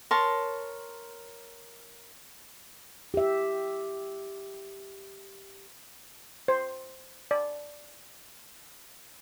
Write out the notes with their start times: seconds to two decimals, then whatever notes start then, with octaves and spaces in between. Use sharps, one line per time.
0.11 A#4 C#5 A5 C6
3.14 G4 E5
6.48 C5
7.31 D5